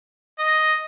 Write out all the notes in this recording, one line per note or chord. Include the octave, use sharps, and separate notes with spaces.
D#5